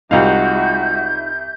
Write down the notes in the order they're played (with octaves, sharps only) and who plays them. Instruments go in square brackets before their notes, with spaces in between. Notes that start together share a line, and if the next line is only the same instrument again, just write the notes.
[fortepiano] C2 F5 [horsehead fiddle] G#3 F#4 [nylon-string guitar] D#4 F4 [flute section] E5 G6